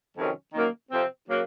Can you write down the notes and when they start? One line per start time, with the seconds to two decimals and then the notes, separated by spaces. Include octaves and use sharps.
0.17 F2 C3 D#3 F#3 C#4
0.54 D#3 F#3 A#3 C#4
0.91 F2 C3 F3 C4
1.28 C#3 F#3 A#3